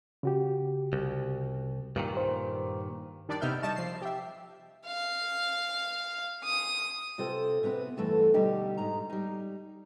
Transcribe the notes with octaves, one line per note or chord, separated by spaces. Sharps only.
C#3 F#4 G4
C2
G2 A#2 D#3
C5
D#3 G3 D4 D5
C3 B3 D#4 E5 F6 G6
G3 D#5 A5 C#6 E7
F3 C7
G4 E5
F5
D#6
C3 F4 A4 C5 G5
C3 B3 C4 A4 B4
G2 E3 A3 A4 F#5
B2 D3 G3 D#4 G4
G#2 D#4 A#5
G3 D#4